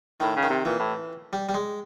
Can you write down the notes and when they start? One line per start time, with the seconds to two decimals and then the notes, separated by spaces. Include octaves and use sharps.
0.20 A2 D#3
0.36 C#3
0.43 D#3
0.50 C3
0.65 A#2 E3
0.80 A2
1.33 G3
1.49 G3
1.54 G#3